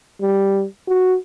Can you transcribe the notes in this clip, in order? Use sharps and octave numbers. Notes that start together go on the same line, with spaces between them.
G3
F#4